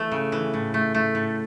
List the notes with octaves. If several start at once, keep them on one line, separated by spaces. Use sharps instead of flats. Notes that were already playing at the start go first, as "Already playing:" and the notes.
Already playing: E3 A3
C#3
E3
A2
A3
A3
A2